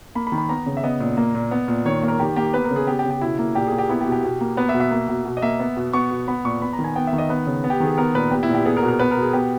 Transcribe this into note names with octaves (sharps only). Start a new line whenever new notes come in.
A#3 B5
B5
D#3
B5
B3 A#5
C#3
E5
B3 D#5
A#2
A#3
A#2
B3
A#2
D#3 C#5
A#3
A#4
D#3 G4
A#3 G4
B3 B4
A#4
C#3
G#4
B3 G4
G4
C#3
G4
B2 E4
A#3 E4
A#2 G4
G#4
A#3
G4
B3 E4
G4
B2
G4
B2
A#3
B3 B4
E5
B2
E5
A#3
B2
B2
D#5
A#3 E5
B3
B2
B3 C#6
B2
B3 B5
A#2 C#6
B3 B5
A#5
D#3
G#5
B3 G5
E5
D#3
D#5
B3 B4
C#3
B3
G4
D#3 G#4
B3 A#4
A#2 B4
B3 G4
E4
A#2
G4
B3 G#4
A#4
B2
A#4
B3 B4
A#4
B2
G#4
B3 G4